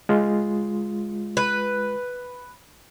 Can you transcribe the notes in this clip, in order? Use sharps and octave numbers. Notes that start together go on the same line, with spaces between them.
G#3 F4
B4